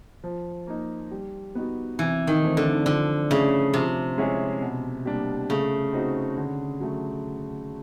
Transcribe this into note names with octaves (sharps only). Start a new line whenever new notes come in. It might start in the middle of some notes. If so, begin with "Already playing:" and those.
F3
A#3 D#4
G3
B3 D#4 F#4
C3 E3
D#3
E3 A3 C4
D3
D3 F3
C#3 A3 C#4 E4
C3 F3
G#3 C#4 E4 G#4
B2
G3 A#3 D4
C#3 A3
C4 D#4 F#4
D3
F#3 A3